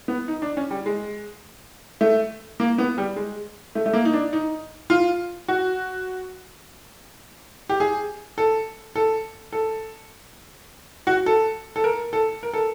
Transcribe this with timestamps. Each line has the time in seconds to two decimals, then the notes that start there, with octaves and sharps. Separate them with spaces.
0.08 B3
0.28 D#4
0.42 D4
0.57 C#4
0.71 G3
0.86 G#3
2.01 A3
2.60 A#3
2.78 B3
2.98 G3
3.16 G#3
3.75 A3
3.86 A3
3.93 A#3
4.05 D#4
4.14 D4
4.33 D#4
4.90 F4
5.48 F#4
7.69 G4
7.80 G#4
8.38 A4
8.96 A4
9.53 A4
11.07 F#4
11.26 A4
11.76 A4
11.84 A#4
12.13 A4
12.43 A#4
12.53 A4